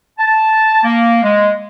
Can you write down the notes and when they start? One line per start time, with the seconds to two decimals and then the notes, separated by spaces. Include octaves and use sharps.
0.19 A5
0.83 A#3
1.23 G#3